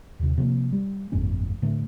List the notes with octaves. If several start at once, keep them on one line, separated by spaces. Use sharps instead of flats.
D#2 C3
C3 F3 A3 A#3
G3
G1 F2 A2 C#4
A2 D3 A3